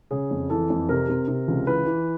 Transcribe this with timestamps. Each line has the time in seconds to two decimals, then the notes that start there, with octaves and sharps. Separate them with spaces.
0.11 C#3 G#4
0.31 F2
0.50 E3 A4
0.70 F2
0.89 C3 A#4
1.08 C3
1.28 C3
1.48 C#2
1.67 E3 B4
1.86 E3